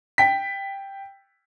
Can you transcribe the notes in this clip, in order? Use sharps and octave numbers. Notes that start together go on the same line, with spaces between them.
G5 B6